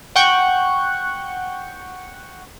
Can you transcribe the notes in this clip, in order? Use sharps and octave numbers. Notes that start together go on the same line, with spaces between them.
F#5 G5 C#6 F#6 G6